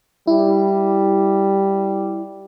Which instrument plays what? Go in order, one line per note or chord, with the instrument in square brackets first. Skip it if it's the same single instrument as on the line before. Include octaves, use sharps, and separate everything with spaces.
[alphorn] G3 [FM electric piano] E4